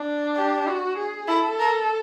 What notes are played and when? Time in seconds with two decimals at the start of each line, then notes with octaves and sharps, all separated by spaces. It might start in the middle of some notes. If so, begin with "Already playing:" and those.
Already playing: D4
0.36 G4
0.67 F#4
0.98 G#4
1.28 E4 A4
1.59 A#4